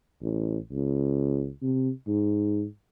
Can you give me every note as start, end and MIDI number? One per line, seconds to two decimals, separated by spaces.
0.22 0.58 33
0.71 1.50 37
1.62 1.90 48
2.07 2.65 44